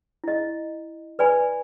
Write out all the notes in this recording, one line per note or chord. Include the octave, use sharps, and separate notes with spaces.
E4 D#5
B4 D5 G#5 B5